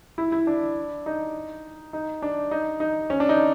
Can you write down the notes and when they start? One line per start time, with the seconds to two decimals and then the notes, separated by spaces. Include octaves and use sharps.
0.18 E4
0.32 E4
0.47 D4
1.06 D#4
1.93 D#4
2.22 D4
2.51 D#4
2.80 D#4
3.10 C#4
3.20 D4
3.29 D#4